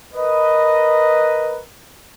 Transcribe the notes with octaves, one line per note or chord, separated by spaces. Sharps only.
A#4 B4 D#5